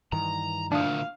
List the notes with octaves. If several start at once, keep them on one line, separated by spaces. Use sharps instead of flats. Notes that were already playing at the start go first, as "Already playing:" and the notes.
G2 D#3 E3 A#5
D2 A#2 D4 F5 D#6